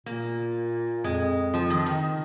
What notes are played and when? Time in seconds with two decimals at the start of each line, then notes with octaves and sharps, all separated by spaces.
0.06 A#2 A#3
1.04 F2 G#3
1.54 F3
1.70 D#3
1.86 D#3